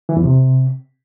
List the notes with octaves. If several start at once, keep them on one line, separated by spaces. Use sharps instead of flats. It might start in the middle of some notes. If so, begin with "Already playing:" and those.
E3
E2
C3